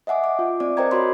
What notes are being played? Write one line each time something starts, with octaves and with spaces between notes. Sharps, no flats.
D#5 E5 F#5 G#5 D6
D6
F4
C4 D5 D6
A#4 C5 D#5 G5 A#5 G#6
F#4 C#5 D#5 B5 C6 D6